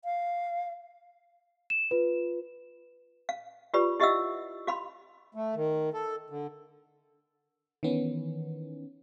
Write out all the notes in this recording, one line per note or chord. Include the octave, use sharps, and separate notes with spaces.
F5
E7
F4 B4
F5
F4 G4 B4 D5 B5
E4 G4 D#5 E5 F#5 E6
F#4 F5 B5 C6
A3
D#3
A4
D3
D#3 E3 B3 C#4